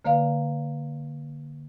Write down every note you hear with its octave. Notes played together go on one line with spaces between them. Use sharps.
D3 A#3 B4 D5 F5